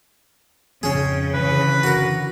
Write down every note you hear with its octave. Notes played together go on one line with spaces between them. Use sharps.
F2 G#2 C#3 F3 C#4 G#4
D3 E3 B4
F#4 A#4